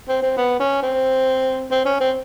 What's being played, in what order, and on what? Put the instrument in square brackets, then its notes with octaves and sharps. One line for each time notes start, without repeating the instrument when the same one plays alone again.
[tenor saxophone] C4
C4
B3
C#4
C4
C4
C#4
C4